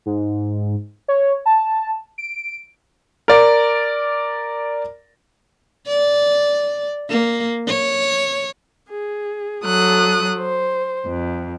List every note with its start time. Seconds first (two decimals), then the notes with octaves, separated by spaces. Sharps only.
0.06 G#2
1.08 C#5
1.46 A5
2.18 D7
3.28 A#4 D5
5.88 D5
7.09 A#3
7.68 C#5
8.90 G#4
9.65 F#3 A4 D#6 F#6
10.40 C5
11.07 F2